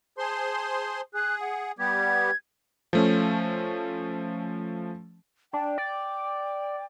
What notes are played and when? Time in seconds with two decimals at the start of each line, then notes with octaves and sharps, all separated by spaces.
0.18 G#4 C5 A5 C6
1.14 G#4 F#6
1.41 F#5
1.79 G3 B3 G4 G#6
2.93 F3 A3 C#4
5.53 D4 G5
5.78 D5